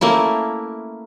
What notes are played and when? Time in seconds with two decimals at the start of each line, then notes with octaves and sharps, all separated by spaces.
0.01 A3 A#3 C#4 E4